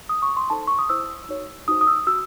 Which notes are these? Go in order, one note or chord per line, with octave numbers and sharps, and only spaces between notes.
D#6
C#6
C6
D#4 A4 C5 A5
C#6
D#6
E4 C5 E6
D#4 F#4 C#5
D#4 F#4 C5 D#6
D#6
E6
F#4 E6